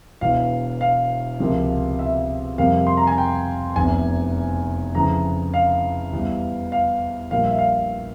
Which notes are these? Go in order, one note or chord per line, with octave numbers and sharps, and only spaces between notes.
E1 E2 E3 F5
F5
C#2 C3 F3 A#3
E5
F2 C3 G3 A#3 F5
C6
A#5
G#5
G5
F1 E2 C3 G#5
F2 C#3 E3 A#5
F5
E2 E3 G3
F5
A#1 A#2 G3 F5
E5
F5